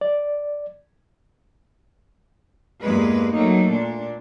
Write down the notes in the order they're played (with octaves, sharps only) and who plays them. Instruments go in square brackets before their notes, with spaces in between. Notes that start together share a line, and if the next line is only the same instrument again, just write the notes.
[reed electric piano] D5
[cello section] E2 G2 G#3 A#3 B4
F#3 A3 A#3 D#4
A#2 D4